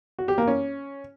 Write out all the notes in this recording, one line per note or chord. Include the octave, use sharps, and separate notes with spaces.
F#4
G4
A#3
C#4